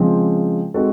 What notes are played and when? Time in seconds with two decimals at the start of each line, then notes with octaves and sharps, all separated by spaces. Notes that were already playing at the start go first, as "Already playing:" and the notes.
Already playing: C#3 F3 G#3 C4
0.74 G#3 C4 D#4 F#4 A4